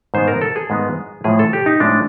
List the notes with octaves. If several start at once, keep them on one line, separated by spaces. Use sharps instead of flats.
G#2 D#3 G#3 B3 C5
A#4
A4
G#4
G#2 D#3 G#3 B3
A2 F3 G#3 G#4
A4
G4
D#4
A2 F3 G#3 D4